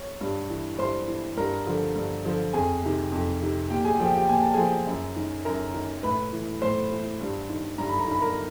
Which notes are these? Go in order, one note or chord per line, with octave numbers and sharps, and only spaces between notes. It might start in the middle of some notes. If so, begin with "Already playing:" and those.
Already playing: C#5
G2
E3
G2 C5 C6
E3
G2 A#4 A#5
D3 F3
G2
D3 F3
F2 G#4 G#5
C3 D#3
F2
C3 D#3
A#2 G4 G5
G#4 G#5
F3 G4 G5
G4 G5
A#2 G#5
A5
F3 G#4 G#5
F#2
D#3
F#2 A#4 A#5
D#3
A2 B4 B5
E3
A2 C5 C6
E3
G2
D#3
G2 A#5
B5
A#5
D#3 B5
A#4 A#5